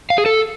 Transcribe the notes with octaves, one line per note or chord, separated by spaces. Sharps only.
F5
G#4
A4